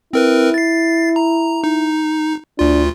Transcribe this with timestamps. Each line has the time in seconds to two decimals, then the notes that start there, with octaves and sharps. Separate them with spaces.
0.13 C4 E4 A#4 B4
0.54 A6 C7
1.16 A#5
1.64 D#4
2.59 D2 D4 F4